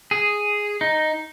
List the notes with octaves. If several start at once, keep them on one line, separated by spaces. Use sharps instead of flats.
G#4
D#4